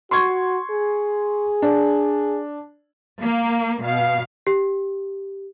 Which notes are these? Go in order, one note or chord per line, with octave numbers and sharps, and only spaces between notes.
F#4 C6 C#6 G#6
G#4
D4
A#3
B2 F5
G4